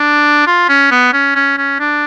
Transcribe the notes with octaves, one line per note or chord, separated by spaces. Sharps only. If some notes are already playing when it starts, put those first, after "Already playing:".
Already playing: D4
F4
C#4
B3
C#4
C#4
C#4
D4